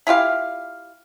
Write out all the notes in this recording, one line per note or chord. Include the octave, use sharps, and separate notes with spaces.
E4 F4 G4 F5